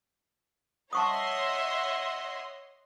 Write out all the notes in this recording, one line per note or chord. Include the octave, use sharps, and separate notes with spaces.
C#5 D#5 E5 F#5 A5 C6 C#6 D#6